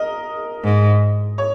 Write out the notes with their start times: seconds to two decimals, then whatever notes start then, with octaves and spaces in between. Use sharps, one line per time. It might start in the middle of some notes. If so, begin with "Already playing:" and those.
Already playing: A#4 D#5
0.64 G#2
1.38 C#5